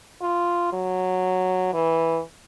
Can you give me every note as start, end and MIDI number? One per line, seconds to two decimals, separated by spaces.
0.22 0.68 65
0.73 1.73 54
1.73 2.20 52